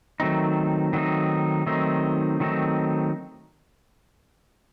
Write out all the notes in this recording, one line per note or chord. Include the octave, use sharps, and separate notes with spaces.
D#3 F#3 A3 C4 D#4
D#3 F#3 A3 C4 D#4
D#3 F#3 A3 C4 D#4
D#3 F#3 A3 C4 D#4